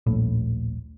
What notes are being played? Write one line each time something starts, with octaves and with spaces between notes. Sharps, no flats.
D#1 A#1 A2